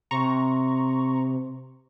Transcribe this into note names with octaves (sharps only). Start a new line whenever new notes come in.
C3 C4 A#5 C6 C#6